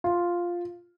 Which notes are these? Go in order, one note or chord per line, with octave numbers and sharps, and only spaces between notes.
F4